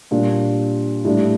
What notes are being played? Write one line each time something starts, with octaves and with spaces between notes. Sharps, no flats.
A#2 G3 D4
A2 G3 D4